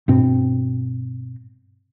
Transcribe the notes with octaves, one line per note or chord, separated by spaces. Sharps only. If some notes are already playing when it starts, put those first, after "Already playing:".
G2 B2 C4